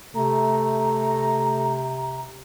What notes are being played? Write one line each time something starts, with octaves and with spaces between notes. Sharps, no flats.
C3 A3 A#5